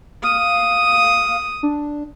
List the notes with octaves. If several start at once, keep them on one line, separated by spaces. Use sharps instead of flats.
F5 D#6
D4